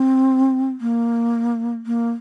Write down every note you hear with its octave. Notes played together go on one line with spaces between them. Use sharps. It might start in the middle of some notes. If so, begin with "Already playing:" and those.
Already playing: C4
A#3
A#3